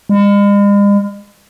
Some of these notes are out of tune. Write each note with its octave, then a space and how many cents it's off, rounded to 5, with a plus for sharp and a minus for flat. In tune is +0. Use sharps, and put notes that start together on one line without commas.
G#3 -45